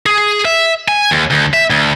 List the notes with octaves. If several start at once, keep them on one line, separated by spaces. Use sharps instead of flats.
G#4
E5
G#5
D#2
D2
E5
D2